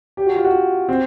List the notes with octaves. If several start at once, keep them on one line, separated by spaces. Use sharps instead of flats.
G4
F#4
F4
F#4
C4